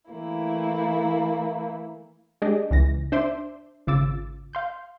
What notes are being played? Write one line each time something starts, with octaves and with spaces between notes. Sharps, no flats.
E3 A3 A#3 E4
G#3 D4 G4 G#4 D5 D#5
C#2 E3 A#6
D4 C5 E5 C6 D6
G#1 C#3 F4 D6 E6 A6
F5 C6 G6